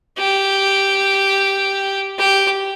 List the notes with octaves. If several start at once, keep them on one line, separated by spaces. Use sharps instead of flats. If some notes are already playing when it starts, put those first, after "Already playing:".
G4
G4